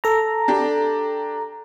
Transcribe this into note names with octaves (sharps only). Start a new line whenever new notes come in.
A4 A#5
D4 G4